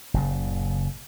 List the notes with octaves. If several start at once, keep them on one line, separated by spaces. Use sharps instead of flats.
F#1 A#2 C#3